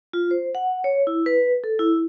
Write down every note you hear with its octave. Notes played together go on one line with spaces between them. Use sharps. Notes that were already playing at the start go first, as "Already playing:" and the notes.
F4
C5
F#5
C#5
E4
B4
A4
E4